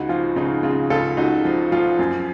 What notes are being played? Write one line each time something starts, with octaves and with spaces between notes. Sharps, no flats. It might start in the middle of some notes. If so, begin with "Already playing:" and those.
Already playing: C#2 D#4 F#4
F3 F4
C#3 D#4
C#3 F4
C#2 F4 A4
C#2 D#4 F#4
F3
F3 F4
F#2